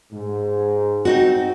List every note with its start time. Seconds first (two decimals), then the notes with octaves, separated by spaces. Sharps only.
0.13 G#2
1.05 C4 D#4 F#4